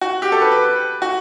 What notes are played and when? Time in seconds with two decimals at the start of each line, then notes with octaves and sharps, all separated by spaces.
0.01 F#4
0.22 G4
0.32 A4
0.42 B4
0.52 B4
1.02 F#4